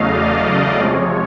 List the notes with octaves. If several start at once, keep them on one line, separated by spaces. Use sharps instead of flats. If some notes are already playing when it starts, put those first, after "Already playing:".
Already playing: E2 C#3 F#3 A3 D#5 F5
D5
C3 F3 G#3 C#5